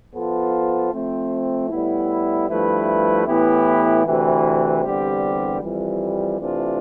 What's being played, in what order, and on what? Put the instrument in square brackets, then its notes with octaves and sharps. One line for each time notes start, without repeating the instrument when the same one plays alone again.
[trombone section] F3 B3 F4 A4 C5
F3 A3 C4
A2 G3 B3 E4
G2 F3 A3 E4 B4
A2 E3 B3 E4 G4
D2 C3 E3
E2 D3 G3 C4 G4
F2 E3 G3
C3 E3 A3 D4 F4